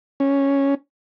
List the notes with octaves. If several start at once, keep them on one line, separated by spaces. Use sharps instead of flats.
C#4